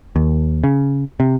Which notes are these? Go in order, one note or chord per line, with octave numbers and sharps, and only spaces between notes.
D#2
C#3
C3